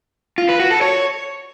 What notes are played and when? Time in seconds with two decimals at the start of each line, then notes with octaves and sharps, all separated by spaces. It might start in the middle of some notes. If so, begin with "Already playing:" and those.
0.38 F4
0.49 B4
0.60 F#4
0.70 A4
0.81 C#5